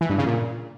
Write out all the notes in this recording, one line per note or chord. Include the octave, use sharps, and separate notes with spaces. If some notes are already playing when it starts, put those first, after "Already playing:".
E3
G2
C#3
A#2